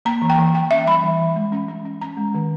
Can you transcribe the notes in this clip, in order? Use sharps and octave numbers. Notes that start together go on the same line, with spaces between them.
A#3 A#5
E3
G5
E3
E3 G5
C#4 E5
G3 B5
E3
E3
G#3
C#4
C#4
C#4
C#4 A#5
G#3
D#3